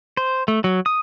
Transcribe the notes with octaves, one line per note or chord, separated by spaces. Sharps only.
C5
A3
F#3
D#6